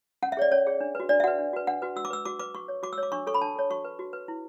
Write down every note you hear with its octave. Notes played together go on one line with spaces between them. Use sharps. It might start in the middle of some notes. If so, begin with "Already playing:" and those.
C#4 F#5
E5
G#4 C#5 D5
C#4 C#5
G#4 C#5
D4
F#4 B4
D4 D5
E5
F#4 B4 F#5
D4
F#4 B4
D4 F#5
F#4 B4
F#4 E6
D6
B4 E6
F#4 D6
B4 D6
F#4 C#6
C#5
F#4 D6
E6
C#5
D6
D4 C#6
A4 C#5 C#6
B5
D4 A5
A4 C#5
F#4 C#6
B4
F#4
B4
E4